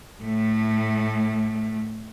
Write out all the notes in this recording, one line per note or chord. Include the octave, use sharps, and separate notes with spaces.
A2 A3